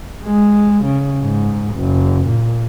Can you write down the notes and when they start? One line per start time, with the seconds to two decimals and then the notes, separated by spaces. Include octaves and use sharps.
0.25 G#3
0.84 C#3
1.21 G#2
1.75 F#1
2.27 A#2